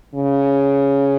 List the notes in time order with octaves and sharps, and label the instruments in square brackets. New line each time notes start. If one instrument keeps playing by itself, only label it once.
[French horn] C#3